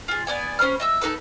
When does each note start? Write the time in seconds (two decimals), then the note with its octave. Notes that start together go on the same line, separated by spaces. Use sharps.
0.08 F4 G#4
0.27 B3 D5 G#5
0.59 C#4 C5 B5 F6
0.80 D#5 E5 E6
1.01 D#4 G#4 A4 B4